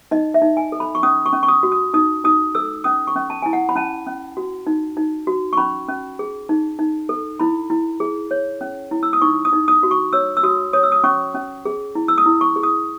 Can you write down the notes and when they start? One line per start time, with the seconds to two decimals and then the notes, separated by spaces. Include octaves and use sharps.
0.11 D#4 D#5
0.34 E5
0.42 D#4
0.57 G#5
0.72 A4
0.80 B5
0.95 C#6
1.03 C#4 D#6
1.26 C#6
1.33 C#4
1.43 C#6
1.48 D#6
1.63 F#4
1.72 D#6
1.94 D#4 D#6
2.24 D#4 D#6
2.55 A4 E6
2.84 C#4 D#6
3.07 C#6
3.16 C#4
3.30 A5
3.42 E4 G#5
3.53 F#5
3.69 B5
3.76 C#4 A5
4.07 C#4
4.37 F#4
4.67 D#4
4.97 D#4
5.27 F#4
5.53 C#6
5.57 C#4 B5
5.88 C#4
6.19 G#4
6.49 D#4
6.79 D#4
7.09 A4
7.40 E4 B5
7.70 E4
8.00 G#4
8.31 C#5
8.61 C#4
8.91 E4
9.03 E6
9.13 D#6
9.22 D#4 C#6
9.45 D#6
9.53 D#4
9.68 D#6
9.83 F#4
9.91 C#6
10.13 C#5 E6
10.37 E6
10.43 F#4 D#6
10.73 C#5 D#6
10.83 E6
10.92 D#6
11.04 C#4 C#6
11.34 C#4
11.65 G#4
11.95 E4
12.08 E6
12.18 D#6
12.26 E4
12.41 C#6
12.56 G#4
12.63 D#6